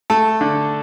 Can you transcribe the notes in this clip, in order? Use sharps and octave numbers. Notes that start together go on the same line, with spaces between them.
A3 A4
D3